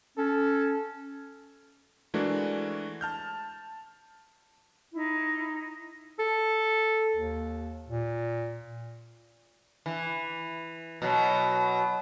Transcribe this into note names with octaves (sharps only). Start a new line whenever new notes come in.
C#4 A4
E3 G#3 A3 D4 F#4 A#4
A5 F6 G6
D#4 E4
A4
D#2
A#2
E3
B2 F#3